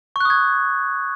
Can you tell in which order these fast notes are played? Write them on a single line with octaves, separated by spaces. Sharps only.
C#6 F#6 D#6 G#6